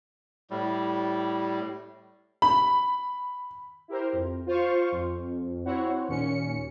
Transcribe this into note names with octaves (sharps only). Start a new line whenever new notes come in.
A2 G3
B5
E4 G4 A#4 C5
F2
F4 C5 F5 C#6
F2
C4 E4 F#4 C5 C#5 F#5
D#2 A#2 C#4 C#7